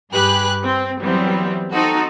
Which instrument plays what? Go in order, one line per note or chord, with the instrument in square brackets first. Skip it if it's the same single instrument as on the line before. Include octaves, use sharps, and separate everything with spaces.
[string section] G2 G4 G#4 B4 F#6
C4
E3 F#3 G3 B3 C4
C4 D#4 F#4 A4